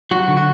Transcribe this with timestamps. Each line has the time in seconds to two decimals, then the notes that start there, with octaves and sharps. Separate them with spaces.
0.11 F#3 F#4
0.28 D3
0.37 F#4